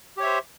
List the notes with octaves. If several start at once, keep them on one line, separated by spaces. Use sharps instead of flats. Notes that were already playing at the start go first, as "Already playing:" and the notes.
G4 C5 C#5 E5